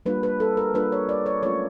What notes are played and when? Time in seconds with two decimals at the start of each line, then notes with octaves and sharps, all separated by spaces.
0.06 G3 A#3 D4 F4 B4
0.23 B4
0.40 A4
0.57 A#4
0.74 G3 A#3 D4 F4 B4
0.92 C#5
1.09 D5
1.26 C#5
1.43 F#3 A3 C#4 F4 C#5